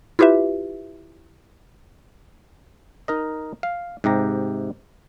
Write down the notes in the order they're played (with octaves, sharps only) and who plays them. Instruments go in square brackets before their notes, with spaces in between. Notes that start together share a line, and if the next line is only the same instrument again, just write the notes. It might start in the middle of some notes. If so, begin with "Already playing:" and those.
[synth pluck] E4 F4 G4 B4 E5
[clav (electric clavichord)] D#4 A#4 D#5
F5
G#2 C3 G4 A#5